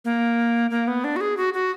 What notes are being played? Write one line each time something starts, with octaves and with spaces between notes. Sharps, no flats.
A#3
A#3
B3
D4
F#4
G#4
F#4
F#4